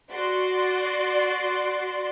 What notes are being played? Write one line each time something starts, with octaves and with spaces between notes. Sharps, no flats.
F#4 D5 C6